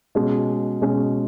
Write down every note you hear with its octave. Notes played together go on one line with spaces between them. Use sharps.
B2 G#3 C#4
B2 G#3 C#4